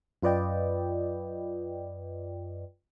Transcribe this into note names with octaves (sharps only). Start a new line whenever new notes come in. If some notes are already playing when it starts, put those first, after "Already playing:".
F#2 F4 B4 D5 D#5 G5